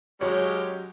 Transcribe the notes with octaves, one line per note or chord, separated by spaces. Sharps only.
F#3 G#3 C#4 G4 C#5